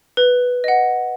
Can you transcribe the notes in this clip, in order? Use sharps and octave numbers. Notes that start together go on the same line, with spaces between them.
B4
D#5 F#5